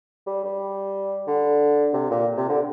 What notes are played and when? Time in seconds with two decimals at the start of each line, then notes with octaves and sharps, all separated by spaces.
0.27 G3
0.44 G3
1.27 D3
1.93 C3
2.11 A#2
2.37 C3
2.49 D3